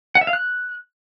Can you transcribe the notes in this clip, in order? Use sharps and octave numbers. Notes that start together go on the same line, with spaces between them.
F#5
E5
F5
F#6